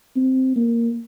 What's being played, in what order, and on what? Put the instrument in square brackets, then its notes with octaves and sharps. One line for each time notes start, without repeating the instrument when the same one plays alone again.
[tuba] C4
A#3